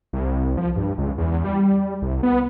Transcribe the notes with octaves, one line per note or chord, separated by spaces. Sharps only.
C2
F3
G2
C#2
E2
G3
C2
B3